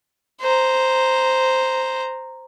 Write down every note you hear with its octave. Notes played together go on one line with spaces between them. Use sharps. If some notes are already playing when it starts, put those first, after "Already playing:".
C5 A#5